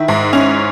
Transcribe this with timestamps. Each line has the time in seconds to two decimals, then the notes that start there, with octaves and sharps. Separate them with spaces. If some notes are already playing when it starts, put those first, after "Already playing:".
Already playing: D#3 E4
0.08 G#2
0.33 C#4